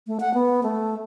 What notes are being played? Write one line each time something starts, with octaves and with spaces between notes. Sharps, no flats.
A3
F#5
B3
A3